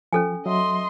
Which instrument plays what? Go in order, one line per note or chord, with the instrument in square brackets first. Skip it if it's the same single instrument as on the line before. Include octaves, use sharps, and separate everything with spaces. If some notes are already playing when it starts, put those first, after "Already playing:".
[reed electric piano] F3 [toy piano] C#4 A4 G#5
[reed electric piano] F#3 E5 [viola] D#5 C6